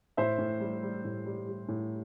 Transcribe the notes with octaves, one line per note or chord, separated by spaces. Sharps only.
A2 C5 E5
A2
G3
G3
A2
G3
G3
A2